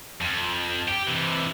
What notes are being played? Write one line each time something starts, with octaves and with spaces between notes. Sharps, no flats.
F2
G4
C3 E3